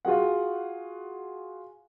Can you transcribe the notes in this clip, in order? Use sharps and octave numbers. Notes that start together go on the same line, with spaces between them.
F4 F#4 G#4 F#5